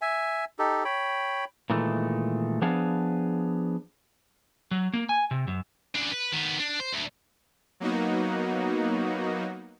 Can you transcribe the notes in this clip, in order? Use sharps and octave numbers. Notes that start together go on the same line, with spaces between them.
E5 G#5
D#4 G4 A4
C#5 G5 B5
A#2 D#3 E3 G#3 A3
F3 B3 D4 G#4 B4 F5
F#3
A#3
G#5
C3
F#2
C#3 D4
B4
D#3 B3
D4
C5
D2
F#3 A#3 B3 D#4 F#4